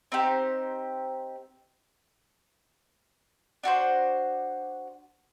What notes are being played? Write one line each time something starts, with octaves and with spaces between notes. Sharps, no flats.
C4 D#4 G4 C5
D4 F#4 A4 C5